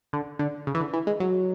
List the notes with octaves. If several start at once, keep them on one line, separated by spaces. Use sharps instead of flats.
D3
D3
C#3
E3
D3
E3
G#3
F#3